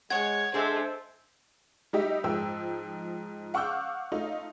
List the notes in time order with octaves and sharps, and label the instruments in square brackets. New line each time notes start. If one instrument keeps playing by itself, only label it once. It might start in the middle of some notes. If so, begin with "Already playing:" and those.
[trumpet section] G#3 [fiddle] C#5 [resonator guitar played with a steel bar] F#5 [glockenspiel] G#6
[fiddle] G#3 [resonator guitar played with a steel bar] D4 G#4 [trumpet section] A4 C5 E5
[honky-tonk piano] G3 D#4 G4 D#5 E5
G#2 F3 G5 E6
F5 F#5 C#6 D6 E6 G6
A3 D#4 F4